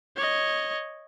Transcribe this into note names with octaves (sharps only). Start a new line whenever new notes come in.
C#5 D#5